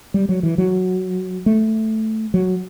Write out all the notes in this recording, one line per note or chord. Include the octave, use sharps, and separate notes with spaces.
G3
F#3
E3
F#3
A3
F#3